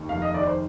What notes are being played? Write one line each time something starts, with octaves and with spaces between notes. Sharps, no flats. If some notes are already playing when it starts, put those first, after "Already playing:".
Already playing: D#2
F1 F5
D#5
D#3 D5
C5